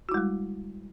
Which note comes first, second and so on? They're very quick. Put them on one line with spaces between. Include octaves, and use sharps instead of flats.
F#4 E4 G#3 G3